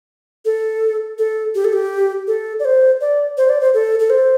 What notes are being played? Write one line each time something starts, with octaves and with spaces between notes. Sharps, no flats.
A4
A4
G4
A4
G4
A4
D5
C5
D5
C5
D5
C5
A4
A4
C5